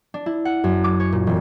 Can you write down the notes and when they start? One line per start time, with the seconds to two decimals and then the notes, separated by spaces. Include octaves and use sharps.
0.14 D4
0.26 E4
0.45 F#5
0.64 F#2
0.84 D6
1.00 C#5
1.12 A#2
1.27 E1